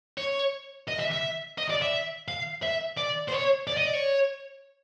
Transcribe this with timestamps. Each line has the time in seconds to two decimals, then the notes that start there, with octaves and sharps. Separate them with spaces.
0.18 C#5
0.88 D#5
0.99 E5
1.12 E5
1.58 D#5
1.70 D5
1.82 E5
2.28 F5
2.63 E5
2.98 D5
3.29 C5
3.33 C#5
3.67 D5
3.77 D#5
3.85 D5
3.93 C#5